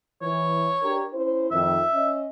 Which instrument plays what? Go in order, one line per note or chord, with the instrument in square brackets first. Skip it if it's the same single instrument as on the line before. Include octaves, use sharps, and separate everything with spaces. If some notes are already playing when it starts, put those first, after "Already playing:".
[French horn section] E3 [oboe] C#5
[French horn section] D4 G4 A#4
C#4 E4 C5
[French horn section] F2 D#3 [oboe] E5
[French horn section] C#4 D#5